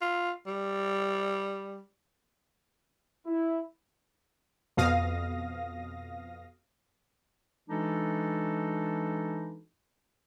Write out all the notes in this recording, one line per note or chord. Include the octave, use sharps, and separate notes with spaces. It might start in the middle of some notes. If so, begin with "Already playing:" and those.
F4
G3
E4
F2 B2 F5 D#6 A#6
E3 G#3 D4 D#4 F#4 A4